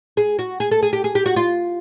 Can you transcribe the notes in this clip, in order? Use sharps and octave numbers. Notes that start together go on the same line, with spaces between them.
G#4
F#4
G#4
A4
G#4
G4
G#4
G4
F#4
F4